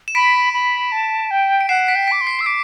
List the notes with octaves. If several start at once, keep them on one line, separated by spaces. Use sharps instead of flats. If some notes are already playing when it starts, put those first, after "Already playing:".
E7
B5 B6 D7
B5
A5
G5
D7
F#5 C7 E7
B6 D7
G5
D6 B6 D7
C6
C7
E6 C7
D6 B6 D7